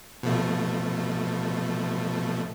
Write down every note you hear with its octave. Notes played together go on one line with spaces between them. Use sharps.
B2 F3 A3